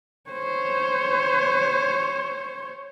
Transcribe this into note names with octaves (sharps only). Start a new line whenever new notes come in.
C5 C#5